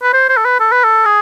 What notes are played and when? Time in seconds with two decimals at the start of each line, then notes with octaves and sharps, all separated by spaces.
0.02 B4
0.13 C5
0.29 C5
0.37 A4
0.45 B4
0.60 A4
0.72 B4
0.84 A4
1.05 G#4